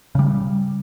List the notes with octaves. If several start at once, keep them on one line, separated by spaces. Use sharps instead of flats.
C#3 G3